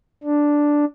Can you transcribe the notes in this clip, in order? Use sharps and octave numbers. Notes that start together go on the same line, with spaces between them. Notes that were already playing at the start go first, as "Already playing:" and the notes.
D4